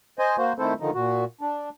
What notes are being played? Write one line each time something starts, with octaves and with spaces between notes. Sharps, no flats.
C5 D#5 G#5
A#3 F#4 C5
D#3 A3 C4 E4 A4 C5
D3 D#3 F3 D#4
A#2 F#4
D4